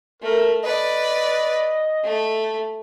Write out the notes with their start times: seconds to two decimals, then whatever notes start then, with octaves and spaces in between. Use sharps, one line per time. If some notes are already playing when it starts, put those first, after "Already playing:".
0.22 A3 A#4
0.63 B4 D5 D#5
2.04 A3